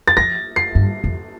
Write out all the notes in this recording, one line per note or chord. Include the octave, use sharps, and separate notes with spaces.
A6
F3 A#6
C7
G2
F2